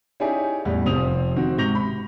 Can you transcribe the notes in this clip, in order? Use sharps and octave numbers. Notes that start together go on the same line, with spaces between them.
C#4 D#4 E4 G4 G#4 D5
E2 A2 G3
F1 F3 C4 D#6 F7
D#3 C4 F#4
G#2 C3 C#6 G6 A#6 F7
B5